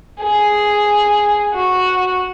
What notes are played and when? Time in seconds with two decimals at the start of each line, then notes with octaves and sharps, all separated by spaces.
0.20 G#4
1.54 F#4